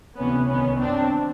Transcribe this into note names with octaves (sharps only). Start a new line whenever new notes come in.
D2 C3 E3 B3 C#4
C2 C3 D#3 B3 C#4
F#2 D#3 C4 D4